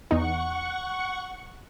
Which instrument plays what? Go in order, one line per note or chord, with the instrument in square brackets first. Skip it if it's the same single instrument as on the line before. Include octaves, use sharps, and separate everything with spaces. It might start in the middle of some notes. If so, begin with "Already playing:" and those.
[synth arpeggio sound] E2 D#4 [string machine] F#5 C#6